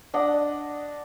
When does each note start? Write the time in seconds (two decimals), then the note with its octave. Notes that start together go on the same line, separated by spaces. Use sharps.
0.14 D4 D#5 F#5